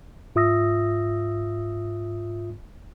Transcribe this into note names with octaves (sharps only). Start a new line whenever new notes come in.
G#2 F4 E5 D#6 E6 A#6